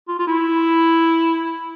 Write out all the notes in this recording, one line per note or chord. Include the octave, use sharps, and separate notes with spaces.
F4
F4
E4